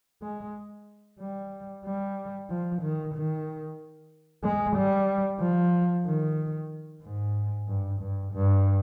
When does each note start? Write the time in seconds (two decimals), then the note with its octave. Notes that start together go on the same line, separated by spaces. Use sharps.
0.23 G#3
1.20 G3
1.85 G3
2.50 F3
2.82 D#3
3.14 D#3
4.44 G#3
4.76 G3
5.41 F3
6.06 D#3
7.03 G#2
7.68 G2
8.01 G2
8.33 G2